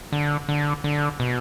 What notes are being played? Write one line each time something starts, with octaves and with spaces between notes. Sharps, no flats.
D3
D3
D3
B2